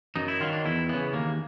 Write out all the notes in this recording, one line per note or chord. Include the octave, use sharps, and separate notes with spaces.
F#2 D#4
E4
D#3 F#3 F4
D4
E2 E4
C#3 E3 B3
D#2 A#3